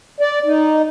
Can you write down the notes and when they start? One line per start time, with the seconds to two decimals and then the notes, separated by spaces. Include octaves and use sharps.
0.20 D5
0.46 D#4